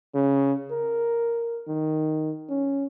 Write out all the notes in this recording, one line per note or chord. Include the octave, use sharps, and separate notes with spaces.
C#3
A#4
D#3
C#4